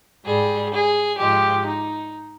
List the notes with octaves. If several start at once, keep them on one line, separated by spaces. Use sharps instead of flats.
G#2 G3 G#4
G#4
G#2 F3 G#3 G4
D#4